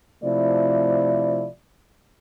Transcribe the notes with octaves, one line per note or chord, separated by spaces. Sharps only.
C3 F3 A3 E4 D5